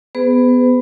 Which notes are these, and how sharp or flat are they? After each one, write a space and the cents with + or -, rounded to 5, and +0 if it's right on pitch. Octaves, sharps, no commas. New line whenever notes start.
B3 +10 G#4 +0 B4 +45